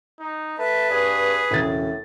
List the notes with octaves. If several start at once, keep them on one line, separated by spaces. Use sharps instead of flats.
D#4
A3 B4 A5
G2 G#4
E1 A2 C#3 A6